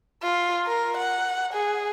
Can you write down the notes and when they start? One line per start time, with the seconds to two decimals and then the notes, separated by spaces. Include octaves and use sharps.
0.23 F4
0.67 A#4
0.97 F#5
1.54 G#4